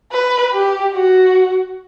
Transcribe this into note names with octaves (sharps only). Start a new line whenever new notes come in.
B4
G4
F#4